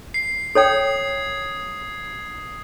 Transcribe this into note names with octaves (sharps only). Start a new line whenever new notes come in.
C7
A4 C#5 G5 D#6 G#6